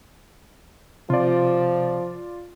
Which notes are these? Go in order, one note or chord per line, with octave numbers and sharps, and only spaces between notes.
C3 F3 F4 D5